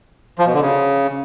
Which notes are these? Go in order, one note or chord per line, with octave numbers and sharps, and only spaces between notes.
F3
B2
D3
C#3